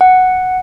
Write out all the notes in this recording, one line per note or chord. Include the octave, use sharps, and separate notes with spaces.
F#5